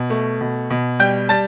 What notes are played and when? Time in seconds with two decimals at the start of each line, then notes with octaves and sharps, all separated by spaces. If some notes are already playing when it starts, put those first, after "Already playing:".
Already playing: B2
0.10 A3
0.41 B2
0.70 B2
1.00 G3 G5 G6
1.29 G3 A5 A6